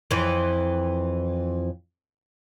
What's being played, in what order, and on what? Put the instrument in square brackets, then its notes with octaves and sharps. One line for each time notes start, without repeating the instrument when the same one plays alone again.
[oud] F2 E3